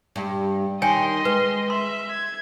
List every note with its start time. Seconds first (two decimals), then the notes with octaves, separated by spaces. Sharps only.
0.16 G2
0.82 D#3 C#5 D#5 G5 G#5 C6
1.25 G#3 B4
1.70 E5 C6
2.10 G#6